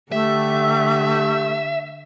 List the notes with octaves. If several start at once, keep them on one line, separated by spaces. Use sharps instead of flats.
D3 A3 G4 E5